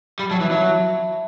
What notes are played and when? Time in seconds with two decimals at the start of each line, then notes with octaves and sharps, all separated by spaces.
0.19 G3 B5
0.30 F#3 A5
0.41 E3 E5
0.51 F#3 E5